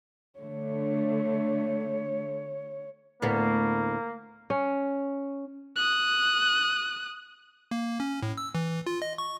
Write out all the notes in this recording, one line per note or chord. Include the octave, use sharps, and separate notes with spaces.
D3 A3 C#5
D2 A2 A#3 B3
C#4
D#6 F#6
A#3
C#4
A2
E6
E3
F4
D#5
C#6